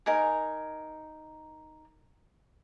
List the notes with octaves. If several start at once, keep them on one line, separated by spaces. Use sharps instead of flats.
D#4 A#4 G#5